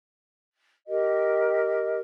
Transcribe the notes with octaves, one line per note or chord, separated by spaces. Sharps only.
G4 A#4 D#5